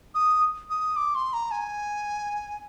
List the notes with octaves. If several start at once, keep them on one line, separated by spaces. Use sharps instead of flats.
D#6
D#6
D6
C6
A#5
G#5